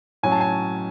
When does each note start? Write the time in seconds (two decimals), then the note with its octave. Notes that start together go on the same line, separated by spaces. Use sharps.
0.23 A2 F#3 C#4 G#5
0.32 A5
0.41 G#5